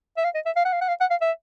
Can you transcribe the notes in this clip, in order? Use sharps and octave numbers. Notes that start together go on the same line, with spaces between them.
E5
F5
D#5
E5
F5
F#5
F5
F#5
F5
F#5
F5
E5